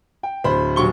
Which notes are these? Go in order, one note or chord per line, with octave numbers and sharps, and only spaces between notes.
G5
D1 C5 B5
D#1 F#3 G4 C#6 G7